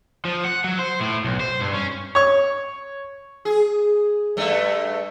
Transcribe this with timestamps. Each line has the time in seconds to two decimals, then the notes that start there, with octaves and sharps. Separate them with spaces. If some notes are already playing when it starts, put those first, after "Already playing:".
0.25 F3
0.44 F#5
0.64 F#3
0.79 C5
1.00 A2
1.24 B1
1.40 C5
1.61 G2
1.74 C#4
2.15 C#5 C#6
3.45 G#4
4.37 G2 A3